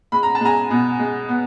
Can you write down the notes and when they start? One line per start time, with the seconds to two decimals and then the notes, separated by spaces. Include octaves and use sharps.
0.12 G#3 B5
0.23 A#5
0.35 A5
0.41 G#3 G#5 A#5
0.71 B2
0.99 G#3
1.29 B3